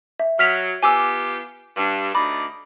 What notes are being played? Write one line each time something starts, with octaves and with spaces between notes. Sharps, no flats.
E5
F#3 F6 B6 F7
B3 F4 G4 G#5 D6 E6
G2
D2 D#4 D5 B5